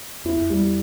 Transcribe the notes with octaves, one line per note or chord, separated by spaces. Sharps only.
E2 E4
F2
E2 G3